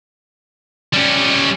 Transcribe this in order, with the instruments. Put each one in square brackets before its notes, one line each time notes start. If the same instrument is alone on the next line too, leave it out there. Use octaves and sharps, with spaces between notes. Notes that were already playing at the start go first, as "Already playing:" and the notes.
[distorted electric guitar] G3 C#4